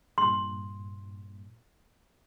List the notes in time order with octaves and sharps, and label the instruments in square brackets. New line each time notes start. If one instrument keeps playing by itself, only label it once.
[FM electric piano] G2 A#2 [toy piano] C6